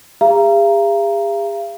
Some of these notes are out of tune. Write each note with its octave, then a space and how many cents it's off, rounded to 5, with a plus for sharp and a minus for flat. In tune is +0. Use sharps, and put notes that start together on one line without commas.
G#4 -45 F5 -45 A#5 +0